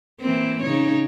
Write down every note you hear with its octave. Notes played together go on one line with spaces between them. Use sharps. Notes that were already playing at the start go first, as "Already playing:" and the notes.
E3 A#3 C4
C#3 D#4 C#5